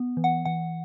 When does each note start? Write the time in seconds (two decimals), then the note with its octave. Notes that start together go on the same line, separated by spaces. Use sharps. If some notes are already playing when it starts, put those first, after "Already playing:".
Already playing: B3
0.17 E3
0.24 F#5
0.45 E3 F#5